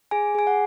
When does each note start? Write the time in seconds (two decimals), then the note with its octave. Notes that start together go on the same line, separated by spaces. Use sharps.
0.11 G#4 G#5
0.35 G#4 G#5
0.47 F#5